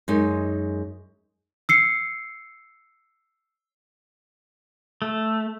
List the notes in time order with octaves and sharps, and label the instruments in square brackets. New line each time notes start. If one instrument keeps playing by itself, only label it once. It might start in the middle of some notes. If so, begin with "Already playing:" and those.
[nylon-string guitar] F#2 G#3 D#4
[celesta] E6 C7 C#7
[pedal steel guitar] A3